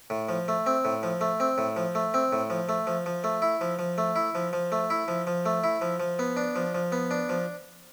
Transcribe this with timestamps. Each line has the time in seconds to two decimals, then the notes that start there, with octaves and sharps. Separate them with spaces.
0.10 A2
0.29 F3
0.48 A3
0.66 C4
0.85 A2
1.03 F3
1.21 A3
1.40 C4
1.58 A2
1.76 F3
1.95 A3
2.14 C4
2.32 A2
2.50 F3
2.69 A3
2.87 F3
3.06 F3
3.24 A3
3.42 E4
3.61 F3
3.79 F3
3.98 A3
4.16 E4
4.35 F3
4.53 F3
4.72 A3
4.90 E4
5.08 F3
5.27 F3
5.46 A3
5.64 E4
5.82 F3
6.00 F3
6.19 B3
6.37 D4
6.56 F3
6.75 F3
6.92 B3
7.11 D4
7.29 F3